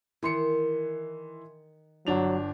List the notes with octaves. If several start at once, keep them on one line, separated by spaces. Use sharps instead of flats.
D#3 E3 C6 C#7
G1 F#3 D4 F7